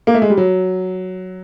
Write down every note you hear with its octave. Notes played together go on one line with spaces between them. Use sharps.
A#3
A3
G#3
G3
F#3